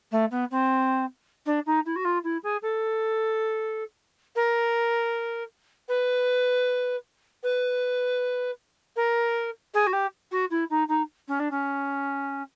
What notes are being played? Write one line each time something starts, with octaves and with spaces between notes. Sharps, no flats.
A3
B3
C4
D4
D#4
E4
F#4
F4
E4
G#4
A4
A#4
B4
B4
A#4
G#4
F#4
G4
F#4
E4
D#4
D#4
C#4
D4
C#4